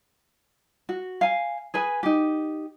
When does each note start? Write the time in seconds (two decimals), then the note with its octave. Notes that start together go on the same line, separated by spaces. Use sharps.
0.89 F#4
1.21 F5 G#5
1.74 G#4 B4 G#5
2.03 D#4 G4